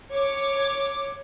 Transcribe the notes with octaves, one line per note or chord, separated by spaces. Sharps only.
C#5 D6